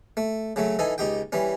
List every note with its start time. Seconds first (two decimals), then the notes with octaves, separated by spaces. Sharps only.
0.17 A3
0.56 C#3 F#3 A3
0.79 E3 D#4 A4 G#5
0.98 C#2 D#4 G4 G5
1.32 E3 G3 C#4